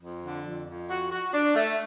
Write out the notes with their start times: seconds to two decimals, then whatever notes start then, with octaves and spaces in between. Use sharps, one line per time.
0.02 F2
0.24 D3
0.46 F2
0.68 F2
0.90 F#4
1.12 F#4
1.34 D4
1.55 A3